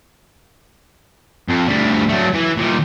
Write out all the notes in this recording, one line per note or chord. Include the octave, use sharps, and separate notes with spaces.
F2
D2 G3
F#3 A3
E3
A#2 D#3